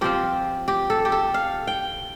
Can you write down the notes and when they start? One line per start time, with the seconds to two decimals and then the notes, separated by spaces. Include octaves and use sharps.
0.01 F3 C4 F4 G4
0.68 G4
0.90 A4
1.05 G4
1.12 A4
1.34 F5
1.67 G5